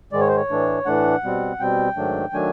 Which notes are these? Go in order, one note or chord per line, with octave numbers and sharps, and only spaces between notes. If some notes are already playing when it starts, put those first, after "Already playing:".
G#2 D#3 G#3 D5
C#5
C5
C#5
A2 E3 A3 D4
A2 E3 A3 D4 F#5
B2 G3 C4
B2 G3 C4 G5
G#2 D#3 F#3 A3 D4
D#3 F#3 A3 D4 G#5